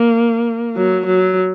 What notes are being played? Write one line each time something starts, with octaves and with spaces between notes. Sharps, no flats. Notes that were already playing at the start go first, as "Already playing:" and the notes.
Already playing: A#3
F#3
F#3